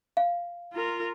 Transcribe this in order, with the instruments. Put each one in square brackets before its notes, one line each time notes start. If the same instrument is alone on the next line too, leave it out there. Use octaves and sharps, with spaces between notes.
[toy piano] F5
[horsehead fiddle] F4 A#4